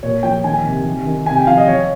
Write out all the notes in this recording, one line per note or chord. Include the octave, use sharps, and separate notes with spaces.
A#2 C#5
F3 G5
D#3 G#5
C3
D#3
D#3
C3 G#5
G5
F3 F5
D#5
F3 C#5